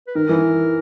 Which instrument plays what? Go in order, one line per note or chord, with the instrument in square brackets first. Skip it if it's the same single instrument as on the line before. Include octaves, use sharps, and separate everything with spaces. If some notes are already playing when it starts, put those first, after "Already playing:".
[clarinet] B4
[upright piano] D#3 [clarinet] A#4
[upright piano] E3